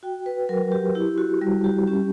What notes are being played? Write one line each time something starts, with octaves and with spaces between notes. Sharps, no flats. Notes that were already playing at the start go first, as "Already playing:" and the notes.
F#4 G5
B4
F#3 A#4
G4
E4 G4
F#4
G3
G4
C#4 G4